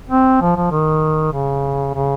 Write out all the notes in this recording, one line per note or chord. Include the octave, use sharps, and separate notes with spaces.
C4
F3
F3
D#3
C#3
C#3